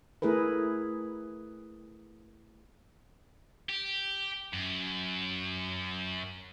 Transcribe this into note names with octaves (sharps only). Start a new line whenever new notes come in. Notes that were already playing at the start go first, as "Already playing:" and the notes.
A3 E4 G#4 A#4 B4
G4
F#2